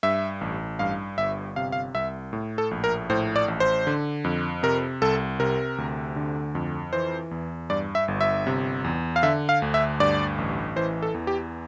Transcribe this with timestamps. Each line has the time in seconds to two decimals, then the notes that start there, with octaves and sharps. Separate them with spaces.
0.03 G2 E5
0.41 A1
0.79 G2 F5
1.18 G1 E5
1.56 C3 F5
1.72 F5
1.95 C2 E5
2.33 A2
2.58 A4
2.71 A#1
2.84 A#4
3.10 A2 C5
3.36 D5
3.48 A1
3.60 C5
3.87 D3
4.24 F2
4.63 C3 A#4
5.02 C2 A4
5.39 C3 A#4
5.78 D2
6.16 D3
6.55 F2
6.93 E3 C5
7.31 E2
7.70 G2 D5
7.95 E5
8.08 G1
8.21 E5
8.47 C3
8.84 E2
9.16 F5
9.23 D3 E5
9.49 F5
9.62 D2
9.74 E5
10.00 G2 D5
10.38 A1
10.76 E3 C5
11.03 A4
11.14 E2
11.27 G4